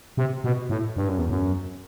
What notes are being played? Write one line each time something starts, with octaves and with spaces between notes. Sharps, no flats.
C3
B2
A2
G2
F#2
E2
F#2